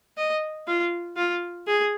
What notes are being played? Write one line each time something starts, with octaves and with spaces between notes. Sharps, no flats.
D#5
F4
F4
G#4